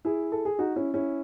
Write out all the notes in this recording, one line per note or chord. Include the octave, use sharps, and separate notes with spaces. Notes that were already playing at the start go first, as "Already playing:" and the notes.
E4 G#4
A4
G#4
D#4 F#4
C#4 E4
C#4 E4